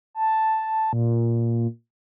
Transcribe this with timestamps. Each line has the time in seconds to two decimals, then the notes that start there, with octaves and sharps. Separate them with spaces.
0.14 A5
0.93 A#2